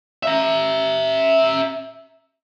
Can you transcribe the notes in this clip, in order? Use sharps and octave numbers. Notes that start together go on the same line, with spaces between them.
E5 A#5